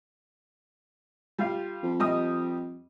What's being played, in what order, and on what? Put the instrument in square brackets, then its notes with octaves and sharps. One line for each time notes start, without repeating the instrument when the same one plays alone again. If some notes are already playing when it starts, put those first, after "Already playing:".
[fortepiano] G3 F4 F5
[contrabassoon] F2
[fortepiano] G3 D#5 D#6